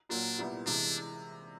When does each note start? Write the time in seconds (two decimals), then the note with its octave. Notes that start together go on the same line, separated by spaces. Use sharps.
0.09 A#2 F#3 A#3 D4
0.38 C2 A#2 G3 B3 E4
0.66 C3 E3 G#3 D4